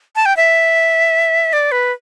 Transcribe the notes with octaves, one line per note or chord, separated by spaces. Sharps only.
A5
G5
E5
D5
B4